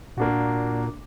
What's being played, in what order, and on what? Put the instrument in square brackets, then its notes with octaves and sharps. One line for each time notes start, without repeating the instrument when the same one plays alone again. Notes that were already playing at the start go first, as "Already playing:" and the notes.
[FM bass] A#2 [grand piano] A#3 D4 F#4